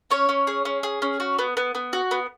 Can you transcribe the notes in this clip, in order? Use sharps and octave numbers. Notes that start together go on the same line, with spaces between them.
C#4 C#5
C#4
G#4
C#4
G#4
C#4
F#4
B3
B3
B3
F#4
B3